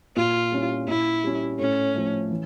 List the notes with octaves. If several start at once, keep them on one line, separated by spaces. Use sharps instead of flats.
A#2 F4
G3 C#4 E4
A#2 E4
G3 C#4
A2 C#4
F3 A3
E3